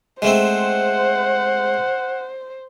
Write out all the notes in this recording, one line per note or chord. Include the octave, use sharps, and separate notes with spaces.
G#3 A3 C4 C5 F#5